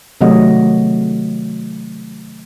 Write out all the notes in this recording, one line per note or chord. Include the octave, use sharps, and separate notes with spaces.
C3 D#3 F#3 A3 F#4 D#5